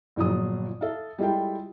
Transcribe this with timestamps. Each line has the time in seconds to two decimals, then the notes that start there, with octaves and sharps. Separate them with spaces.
0.16 G1 A#2 F3 F#3 G#4 D#6
0.81 A4 E5 F5
1.18 G3 G#3 E4 F4 A4 G5